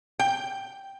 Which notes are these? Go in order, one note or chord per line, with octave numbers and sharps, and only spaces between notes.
G5